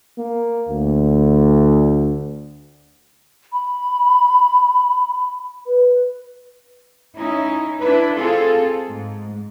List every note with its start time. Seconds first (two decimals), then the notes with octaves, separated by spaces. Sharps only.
0.18 A#3
0.69 D2
3.53 B5
5.66 B4
7.16 C#4 D#4 E4
7.80 D4 E4 B4
8.15 C4 F4 G#4 A4
8.87 G#2